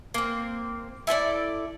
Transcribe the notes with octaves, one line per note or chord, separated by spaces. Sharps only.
A#3 C4
E4 A4 B4 D5